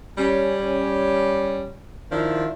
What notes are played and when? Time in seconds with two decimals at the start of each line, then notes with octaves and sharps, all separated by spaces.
0.18 G3 C#4
2.12 D#3 F3 D4 E4